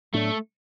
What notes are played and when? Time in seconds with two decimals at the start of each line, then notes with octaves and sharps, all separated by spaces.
0.14 A2 F#3 A3 B3 D4